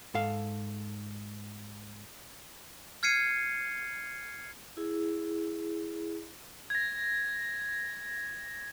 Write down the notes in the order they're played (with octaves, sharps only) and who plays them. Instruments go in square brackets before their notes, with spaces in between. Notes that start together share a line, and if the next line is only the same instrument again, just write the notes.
[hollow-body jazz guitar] G#2 A4 F5
[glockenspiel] F6 G#6 C7 C#7 D#7
[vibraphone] E4 G#4
[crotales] G#6 A#6